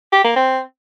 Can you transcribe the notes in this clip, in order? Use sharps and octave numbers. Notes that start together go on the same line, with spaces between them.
G4
A#3
C4